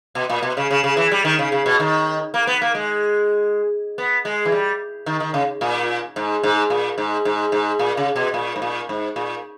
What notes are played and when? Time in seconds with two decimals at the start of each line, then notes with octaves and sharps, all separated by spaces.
0.15 B2
0.30 A#2
0.43 B2
0.57 C#3
0.71 C#3
0.84 C#3
0.97 E3
1.11 G3
1.25 D#3
1.39 C#3
1.52 C#3
1.66 B2
1.80 D#3
2.34 A#3
2.47 B3
2.62 A#3
2.75 G#3
3.98 B3
4.25 G#3
4.45 E3
4.52 G3
5.06 D#3
5.20 D#3
5.34 C#3
5.61 A#2
6.16 G#2
6.43 G#2
6.70 A#2
6.98 G#2
7.25 G#2
7.52 G#2
7.79 A#2
7.97 C#3
8.16 B2
8.34 A#2
8.56 G#2
8.62 A#2
8.89 G#2
9.16 A#2